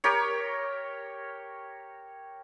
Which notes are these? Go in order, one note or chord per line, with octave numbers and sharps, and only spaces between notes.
G4 A#4 C#5